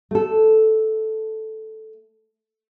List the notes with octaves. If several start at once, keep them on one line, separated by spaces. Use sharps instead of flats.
A3 A4